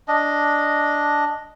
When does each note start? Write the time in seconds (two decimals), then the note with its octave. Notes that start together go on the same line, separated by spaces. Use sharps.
0.08 D4 D#5